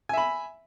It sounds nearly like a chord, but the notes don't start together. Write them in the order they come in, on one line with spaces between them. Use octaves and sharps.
G#5 E5 B5